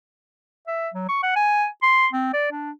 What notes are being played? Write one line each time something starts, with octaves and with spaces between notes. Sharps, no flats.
E5
F#3
C#6
F#5
G#5
C6
C4
D5
D4